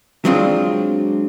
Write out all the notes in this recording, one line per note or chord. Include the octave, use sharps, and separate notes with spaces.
F#3 G#3 C4 D4 F4